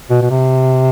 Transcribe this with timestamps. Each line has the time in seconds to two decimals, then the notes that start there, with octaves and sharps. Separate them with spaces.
0.10 B2
0.21 B2
0.30 C3